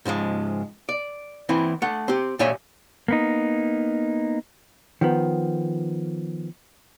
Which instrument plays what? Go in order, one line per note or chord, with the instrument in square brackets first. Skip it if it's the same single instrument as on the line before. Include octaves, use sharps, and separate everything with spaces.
[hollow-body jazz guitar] G#2 C#3 F3 G#3
D5
E3 C4 E4
A3 F#5
C4 G4
A#2 A3 G4 C#5 E5 G#5
[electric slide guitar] A#3 B3 D#4
[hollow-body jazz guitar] D#3 F3 B3